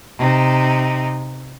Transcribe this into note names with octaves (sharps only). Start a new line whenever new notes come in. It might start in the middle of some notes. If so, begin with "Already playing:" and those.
C3 D#4